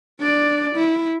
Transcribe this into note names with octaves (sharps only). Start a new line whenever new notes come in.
D4 D5
E4